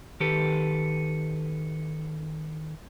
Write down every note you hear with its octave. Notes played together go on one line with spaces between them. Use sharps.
D#3 G4 A4 B4